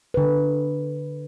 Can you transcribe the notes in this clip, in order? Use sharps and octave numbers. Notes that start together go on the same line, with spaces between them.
D3 B4